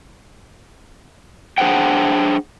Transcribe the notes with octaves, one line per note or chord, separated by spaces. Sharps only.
D4 G#4 C5 F#5 G5